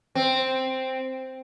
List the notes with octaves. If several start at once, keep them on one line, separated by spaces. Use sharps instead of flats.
C4